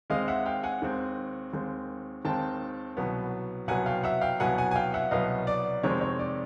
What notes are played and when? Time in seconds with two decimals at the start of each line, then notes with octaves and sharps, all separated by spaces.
0.10 D#2 D#3 G#3 C4 D#5 F5
0.28 E5 F#5
0.45 F5 G5
0.63 F#5 G#5
0.82 D#2 D#3 G#3 C4
1.53 D#2 D#3 G#3 C4
2.25 D#2 D#3 G#3 C4 G5 A5
2.97 C2 B2 F#3 B3
3.68 C2 B2 F#3 B3 F#5 G#5
3.86 F5 G5
4.03 E5 F#5
4.21 F5 G5
4.40 C2 B2 F#3 B3 F#5 G#5
4.58 F#5 G#5
4.71 G#5
4.76 F5 G5
4.94 E5 F#5
5.11 C2 B2 F#3 B3 D#5 F5
5.47 D5
5.83 F2 C3 D#3 G#3 C4 C#5
6.01 C#5
6.19 D5